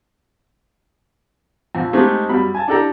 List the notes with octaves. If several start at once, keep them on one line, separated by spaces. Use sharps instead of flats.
A#1 F2
G#3 A3 C4 D#4 G4 G#4
F#2 G3 B5
G#5 A5
D4 E4 G4 A4 G5 A#5